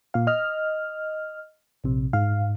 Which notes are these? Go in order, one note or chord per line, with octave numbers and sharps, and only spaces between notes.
A#2 F5
D#5 F6
A#1 C3
G#2 F5